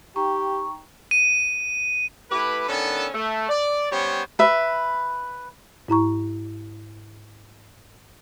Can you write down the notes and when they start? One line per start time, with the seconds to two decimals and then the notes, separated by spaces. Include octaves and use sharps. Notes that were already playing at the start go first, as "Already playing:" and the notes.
0.16 D#4 G4 G5 A#5 C#6
1.11 D#7
2.30 A3 E4 G4 B4
2.68 D#3 B3 C#4 D4 A4
3.14 A3
3.49 D5
3.91 G3 B3 C#4 G4 C5 C#5
4.39 B4 E5
5.88 G#2 E4 A#5 C#6